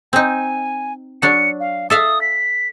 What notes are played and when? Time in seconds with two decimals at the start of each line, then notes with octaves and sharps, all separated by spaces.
0.13 C4 D#4 G#5
1.22 F#3 D4 C#5 C#7
1.60 F5
1.90 A4 E5 F5 D#6
2.21 B6